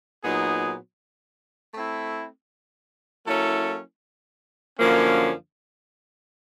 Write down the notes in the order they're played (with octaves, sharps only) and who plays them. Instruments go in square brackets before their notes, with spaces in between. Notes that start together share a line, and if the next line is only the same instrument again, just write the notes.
[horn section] A#2 F#3 B3 D#4 G#4
A3 C4 E4
F#3 A#3 C#4 E4 A4
F#2 D3 F3 A#3 C#4